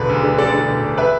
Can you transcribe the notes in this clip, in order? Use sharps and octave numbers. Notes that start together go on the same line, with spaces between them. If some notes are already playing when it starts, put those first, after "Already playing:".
Already playing: E1 D3 B4
D2
D3
D2 A4 D5
D3
E1
E1
B4 E5